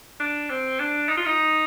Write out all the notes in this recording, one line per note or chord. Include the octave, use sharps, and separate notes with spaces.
D4
C4
D4
D#4
F4
D#4